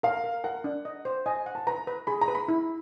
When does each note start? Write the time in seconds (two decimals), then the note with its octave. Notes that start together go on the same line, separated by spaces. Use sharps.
0.03 A#4 F5
0.24 A#4
0.44 A#4 F#5
0.64 D4
0.85 D#5
1.05 C5
1.26 D#5 G#5
1.46 F#5
1.55 A5
1.67 B4 A#5
1.87 B4
2.07 G#4 B5
2.21 A#5
2.28 B4
2.35 B5
2.48 E4